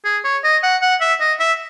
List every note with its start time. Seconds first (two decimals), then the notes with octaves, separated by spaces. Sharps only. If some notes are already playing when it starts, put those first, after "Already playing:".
0.05 G#4
0.24 C#5
0.44 D#5
0.63 F#5
0.82 F#5
1.01 E5
1.20 D#5
1.39 E5